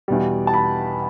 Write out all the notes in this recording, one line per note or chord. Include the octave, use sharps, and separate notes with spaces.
E2 B2 G3
A5
B5